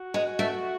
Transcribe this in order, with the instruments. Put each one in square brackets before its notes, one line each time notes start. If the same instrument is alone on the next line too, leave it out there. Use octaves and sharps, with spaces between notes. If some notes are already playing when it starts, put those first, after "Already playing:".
Already playing: [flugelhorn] F#4
[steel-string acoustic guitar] G#3
A3